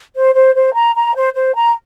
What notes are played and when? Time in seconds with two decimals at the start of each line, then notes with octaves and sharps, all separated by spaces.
0.15 C5
0.35 C5
0.55 C5
0.74 A#5
0.95 A#5
1.15 C5
1.34 C5
1.54 A#5